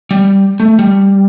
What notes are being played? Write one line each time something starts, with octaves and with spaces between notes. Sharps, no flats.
G3
A3
G3